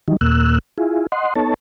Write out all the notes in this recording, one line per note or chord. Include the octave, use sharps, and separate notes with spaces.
D#3 E3 F#3 G3 D#4
D#2 A#2 A#3 E6 F#6
E4 F4 G#4
D#5 F#5 C6
B3 D#4 A4 C#5 A5